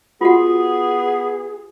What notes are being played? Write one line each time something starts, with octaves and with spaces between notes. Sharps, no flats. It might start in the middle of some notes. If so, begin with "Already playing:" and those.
B3 F4 F#4 G#4 F#5